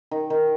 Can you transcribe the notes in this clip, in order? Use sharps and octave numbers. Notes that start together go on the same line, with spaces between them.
D#3
D#3